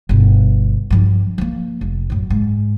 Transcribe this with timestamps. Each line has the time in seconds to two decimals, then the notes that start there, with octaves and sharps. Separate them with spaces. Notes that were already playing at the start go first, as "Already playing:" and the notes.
0.09 G1 B2
0.90 G2 F3
1.38 F3 A#3
1.81 F1
2.10 F#2 A2
2.30 G#2